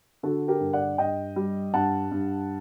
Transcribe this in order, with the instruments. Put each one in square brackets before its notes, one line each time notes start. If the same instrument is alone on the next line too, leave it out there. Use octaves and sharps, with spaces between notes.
[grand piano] D3 F#4 A4
G4 A#4
G2
D5 F#5
G2 D#5 G5
G3
G2 F#5 A5
G2